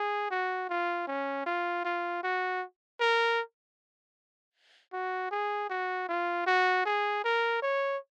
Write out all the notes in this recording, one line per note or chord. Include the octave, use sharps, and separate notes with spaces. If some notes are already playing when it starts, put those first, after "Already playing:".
Already playing: G#4
F#4
F4
C#4
F4
F4
F#4
A#4
F#4
G#4
F#4
F4
F#4
G#4
A#4
C#5